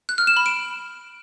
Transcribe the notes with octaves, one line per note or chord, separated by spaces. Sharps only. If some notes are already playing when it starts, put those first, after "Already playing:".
F#6
F6
E7
B5
D7